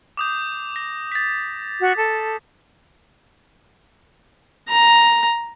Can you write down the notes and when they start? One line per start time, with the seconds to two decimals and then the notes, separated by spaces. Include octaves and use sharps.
0.17 D6 D#6 G6
0.76 A#6
1.12 A6 B6
1.81 F#4
1.97 A4
4.69 A#5